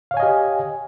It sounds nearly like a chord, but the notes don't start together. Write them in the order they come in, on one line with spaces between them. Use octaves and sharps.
F5 C#5 G#5 D#5 G4